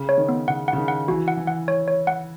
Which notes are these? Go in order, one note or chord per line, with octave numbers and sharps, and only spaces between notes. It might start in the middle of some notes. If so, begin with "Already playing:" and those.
Already playing: C#3
C#5
D#3
B3
C#3 F#5
C#3 F#5
D#3
F#5
E3 F#4
F#5
E3
F#5
C#5
C#5
F#5